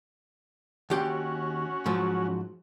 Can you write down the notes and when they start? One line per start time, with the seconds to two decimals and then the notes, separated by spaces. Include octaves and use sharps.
0.90 D#2 C#4 F#4 G4 C6
1.86 G#2 F3 F#3